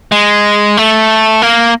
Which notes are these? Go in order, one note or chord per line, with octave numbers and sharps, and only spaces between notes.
G#3
A3
A#3